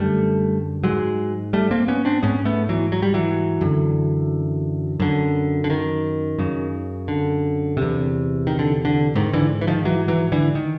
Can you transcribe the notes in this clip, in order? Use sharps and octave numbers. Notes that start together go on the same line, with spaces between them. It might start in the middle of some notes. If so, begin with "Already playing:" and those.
Already playing: F#2 D3 G3 A3
G#2 F#3 G#3
G3 A3
A#3 C4
B3 C#4
C4 D4
G#2 B3 C#4
A3 B3
E3 F#3
F#3
G3
E3 F#3
F#2 D3
F#2 D3
D3
D#3
F#2 C#3
D3
E2 C3
D#3
D3
D3
G#2 D#3
D3 E3
E3
D#3 F3
E3 F#3
E3 F#3
D3 E3
D#3